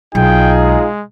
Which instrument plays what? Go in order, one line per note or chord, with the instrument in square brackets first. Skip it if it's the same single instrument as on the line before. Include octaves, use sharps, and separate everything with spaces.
[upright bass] B1 [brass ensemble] D#4 F4 G#4 [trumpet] G5
[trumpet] G#3